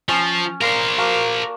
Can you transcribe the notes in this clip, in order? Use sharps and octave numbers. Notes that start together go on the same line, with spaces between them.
F3 C#4
A#3 A#4 C5 D5
A#3 F#4 A5